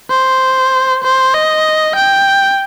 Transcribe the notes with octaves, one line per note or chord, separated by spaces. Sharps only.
C5
C5
D#5
G5